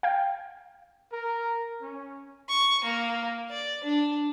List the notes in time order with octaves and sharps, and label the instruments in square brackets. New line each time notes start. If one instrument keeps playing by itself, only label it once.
[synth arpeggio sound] F5 G5
[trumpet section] A#4
C#4
[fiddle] C#6
A#3
D5
D4